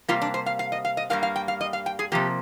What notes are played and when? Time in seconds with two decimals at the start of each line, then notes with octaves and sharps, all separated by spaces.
0.08 C3 G3 A#3 F4
0.22 D4
0.34 C5
0.46 F5
0.59 F5
0.72 D#5
0.85 F5
0.97 D#5
1.10 G2 D#3 G3 A#3 F5
1.23 F5
1.36 G5
1.48 F5
1.61 D#5
1.73 F5
1.86 G5
1.99 G#4
2.12 C3 F3 A#3 G4